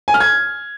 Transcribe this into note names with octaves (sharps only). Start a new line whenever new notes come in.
G#5
F6
G#6